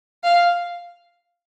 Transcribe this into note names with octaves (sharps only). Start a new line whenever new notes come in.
F5